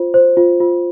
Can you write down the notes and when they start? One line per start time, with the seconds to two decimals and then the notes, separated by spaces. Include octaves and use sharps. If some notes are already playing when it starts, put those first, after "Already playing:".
Already playing: F4 C5
0.14 C5
0.37 F4
0.60 F4